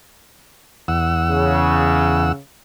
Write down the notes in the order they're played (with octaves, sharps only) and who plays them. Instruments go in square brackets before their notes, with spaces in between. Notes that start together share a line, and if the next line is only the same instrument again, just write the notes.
[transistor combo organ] E2 F#5 E6
[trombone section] C#3